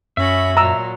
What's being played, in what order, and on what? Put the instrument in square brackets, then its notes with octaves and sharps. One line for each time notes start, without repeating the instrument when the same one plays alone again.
[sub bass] F#2 [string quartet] C#4 F#4 B5 [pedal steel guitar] E5
[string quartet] A#2 F#3 [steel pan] A#5 E6